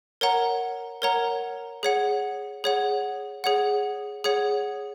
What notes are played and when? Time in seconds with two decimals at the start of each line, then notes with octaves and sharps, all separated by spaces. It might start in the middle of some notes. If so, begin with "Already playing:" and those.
0.21 A#4 C#5 F#5 A#5
1.02 A#4 C#5 F#5 A#5
1.83 G#4 C#5 F#5
2.64 G#4 C#5 F#5
3.44 G#4 C#5 F#5
4.24 G#4 C#5 F#5